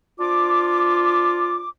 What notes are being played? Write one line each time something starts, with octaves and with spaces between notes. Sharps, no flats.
D4 F4 C5 D6